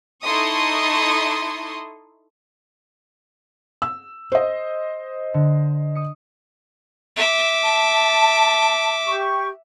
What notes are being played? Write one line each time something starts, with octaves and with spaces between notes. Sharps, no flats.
D#4 E4 A4 C6 C#6 D#6
E6
C5 D#5
D3
D#6 C#7
E5 D6
A5
G4 C#6